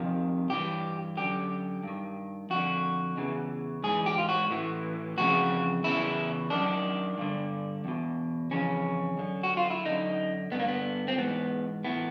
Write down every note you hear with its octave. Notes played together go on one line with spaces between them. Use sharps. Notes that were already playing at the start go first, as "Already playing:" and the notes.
Already playing: F2 C3 D#3
G2 E3 G4
F#2 D3 G4
G2 D#3
F2 D3 F#4
E2 C#3 E3
G#2 E3 G#4
G4
F4
F#4
A2 E3
F2 C#3 E3 F#4
E2 C#3 E3 E4
F#2 D#3 D4
G2 D3
E2 B2
F2 C#3 E3 C#4
F#2 D3
F#4
F4
E4
F#2 D3 D#4
G2 D3 A#3 B3
B3
C4
G#2 E3 B3
A2 E3 B3